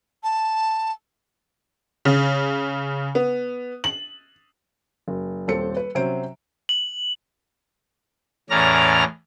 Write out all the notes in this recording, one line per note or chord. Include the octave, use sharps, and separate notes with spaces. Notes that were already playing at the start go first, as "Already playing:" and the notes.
A5
C#3
B3
F#7
F#1
D#1 C4 A4 C#7
B4
C3 F#3 C#4 C5 D7
F#7
E2 A2 C#4 D5 A#5 F6